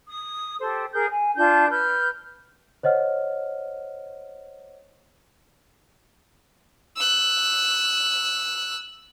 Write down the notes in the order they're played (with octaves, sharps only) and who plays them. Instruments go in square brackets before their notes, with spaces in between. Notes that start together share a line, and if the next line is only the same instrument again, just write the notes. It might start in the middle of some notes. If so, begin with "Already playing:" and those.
[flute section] D#6
G4 A4 C5
G#4 A#4 G6
G#5
D4 F4 A5 G6
B4 F6 G6
[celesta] C5 C#5 D#5 F#5 F6
[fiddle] E6 F#6